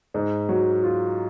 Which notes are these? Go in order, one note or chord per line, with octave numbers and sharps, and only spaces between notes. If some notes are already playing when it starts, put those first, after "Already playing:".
G#2
F#3
F4